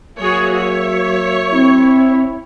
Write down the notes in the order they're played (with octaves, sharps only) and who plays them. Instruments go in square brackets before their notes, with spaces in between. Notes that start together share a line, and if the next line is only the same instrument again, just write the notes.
[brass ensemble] F#3 A#3 E5 [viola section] F#4 G#4 C#5
[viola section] C#5
[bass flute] C4 [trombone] E4